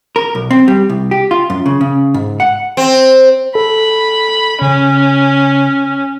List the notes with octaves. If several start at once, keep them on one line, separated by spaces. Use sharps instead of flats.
A#4
B1
C4
G3
C2
G4
F4
F#2
C#3
C#3
G#2
F#5
C4
A4 B5
C#3 C#4